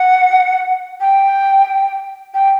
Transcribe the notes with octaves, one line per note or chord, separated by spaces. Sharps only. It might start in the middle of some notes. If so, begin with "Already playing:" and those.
Already playing: F#5
G5
G5